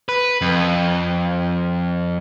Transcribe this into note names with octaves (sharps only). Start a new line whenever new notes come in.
B4
F2